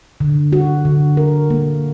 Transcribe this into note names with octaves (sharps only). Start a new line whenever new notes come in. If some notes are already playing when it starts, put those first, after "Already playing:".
D3
F#4
D3
A#4
A#3